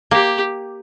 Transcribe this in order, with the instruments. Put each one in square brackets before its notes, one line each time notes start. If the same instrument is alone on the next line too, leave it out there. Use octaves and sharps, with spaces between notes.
[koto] A#3 [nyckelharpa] G4